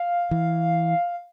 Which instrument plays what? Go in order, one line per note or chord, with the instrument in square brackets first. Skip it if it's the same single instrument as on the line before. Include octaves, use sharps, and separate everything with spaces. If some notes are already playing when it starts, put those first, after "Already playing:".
Already playing: [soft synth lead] F5
[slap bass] E3